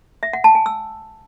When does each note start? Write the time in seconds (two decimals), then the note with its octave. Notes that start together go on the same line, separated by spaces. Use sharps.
0.23 E5
0.33 F#5
0.44 A5
0.55 G#5
0.66 E6